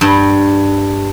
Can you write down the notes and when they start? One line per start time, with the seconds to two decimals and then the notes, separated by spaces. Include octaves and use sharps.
0.01 G2